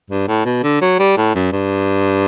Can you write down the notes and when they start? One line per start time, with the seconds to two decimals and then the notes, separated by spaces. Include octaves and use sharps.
0.10 G2
0.28 A2
0.45 B2
0.63 D3
0.81 F#3
0.99 G3
1.17 A2
1.35 F#2
1.52 G2